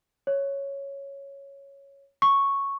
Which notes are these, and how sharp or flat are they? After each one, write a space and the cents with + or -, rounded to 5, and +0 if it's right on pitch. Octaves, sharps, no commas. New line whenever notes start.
C#5 +0
C#6 -5